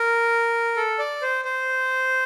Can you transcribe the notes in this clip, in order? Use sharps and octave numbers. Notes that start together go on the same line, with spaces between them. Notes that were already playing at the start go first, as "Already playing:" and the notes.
Already playing: A#4
A4
D5
C5
C5